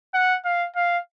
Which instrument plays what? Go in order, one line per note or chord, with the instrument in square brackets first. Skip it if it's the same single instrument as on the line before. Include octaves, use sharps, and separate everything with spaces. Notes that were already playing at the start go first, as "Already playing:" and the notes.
[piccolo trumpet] F#5
F5
F5